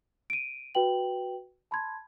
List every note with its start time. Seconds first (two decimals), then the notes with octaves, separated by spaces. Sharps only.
0.30 D7 D#7
0.75 F#4 B4 G5 F#7
1.71 A5 B5 C6 G#6